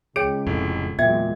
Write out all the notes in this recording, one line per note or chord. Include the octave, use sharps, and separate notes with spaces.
C#2 G#4 C#5 G5 D7
F1 F2 A2
E2 A#2 F#3 G#3 E5 G5 G#6